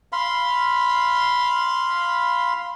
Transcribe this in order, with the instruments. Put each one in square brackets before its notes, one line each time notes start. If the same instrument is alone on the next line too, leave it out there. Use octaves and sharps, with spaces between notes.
[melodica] F5 B5 C6